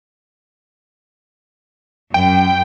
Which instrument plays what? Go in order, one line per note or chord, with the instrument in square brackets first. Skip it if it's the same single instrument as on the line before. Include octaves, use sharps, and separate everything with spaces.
[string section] F#2 [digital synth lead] G5